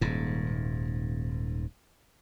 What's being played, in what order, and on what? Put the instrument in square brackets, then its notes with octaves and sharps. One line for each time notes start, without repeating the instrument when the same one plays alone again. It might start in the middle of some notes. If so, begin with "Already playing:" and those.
[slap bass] D#1 G#2